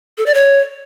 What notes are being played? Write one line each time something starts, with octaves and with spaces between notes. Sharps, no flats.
A4
D5
C#5